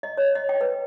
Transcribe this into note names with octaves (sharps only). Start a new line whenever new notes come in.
D#5
C#5
D#5
G5
B4